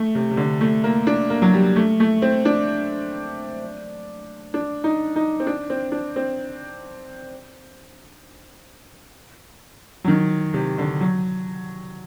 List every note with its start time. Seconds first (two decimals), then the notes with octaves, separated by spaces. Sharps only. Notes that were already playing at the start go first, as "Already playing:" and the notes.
Already playing: A3
0.15 C3
0.31 C3
0.37 D3
0.61 A3
0.84 A#3
1.07 D4
1.30 A#3
1.42 F#3
1.54 G3
1.76 A3
2.00 A3
2.22 C4
2.45 D4
4.54 D4
4.84 D#4
5.16 D#4
5.40 C4
5.47 D4
5.70 C4
5.92 D4
6.16 C4
10.04 F#3
10.08 D#3
10.54 C3
10.78 D3
11.01 F#3